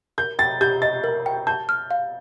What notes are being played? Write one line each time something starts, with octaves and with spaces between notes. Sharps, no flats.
A#4 G6
G5 A6
G4 G6
D#5 A6
A#4
G5
A5 G6
F6
F5